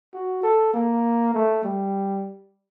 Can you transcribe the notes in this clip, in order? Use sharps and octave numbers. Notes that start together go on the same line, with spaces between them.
F#4
A4
A#3
A3
G3